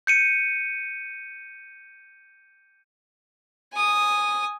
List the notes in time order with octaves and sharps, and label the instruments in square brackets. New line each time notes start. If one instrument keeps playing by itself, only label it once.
[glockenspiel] G6 C#7 D#7
[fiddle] G#5 D#6